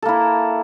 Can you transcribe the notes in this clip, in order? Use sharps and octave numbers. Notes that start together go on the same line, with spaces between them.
A#3 E4 A4